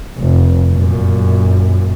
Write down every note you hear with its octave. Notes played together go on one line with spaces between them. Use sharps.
F1
F#2 A#2